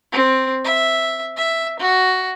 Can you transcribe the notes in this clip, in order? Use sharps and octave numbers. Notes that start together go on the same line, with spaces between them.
C4
E5
E5
F#4